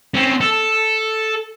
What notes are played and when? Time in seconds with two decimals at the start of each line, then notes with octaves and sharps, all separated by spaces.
0.14 C4 C#4
0.41 A4